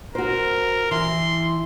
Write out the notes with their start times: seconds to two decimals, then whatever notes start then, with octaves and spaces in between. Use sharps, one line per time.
0.15 F#4 A#4 C5
0.91 E3 C6